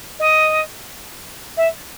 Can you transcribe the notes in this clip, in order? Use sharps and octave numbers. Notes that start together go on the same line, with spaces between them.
D#5
E5